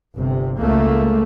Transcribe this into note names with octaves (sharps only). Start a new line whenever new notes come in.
G1 C3
C#2 A3 A#3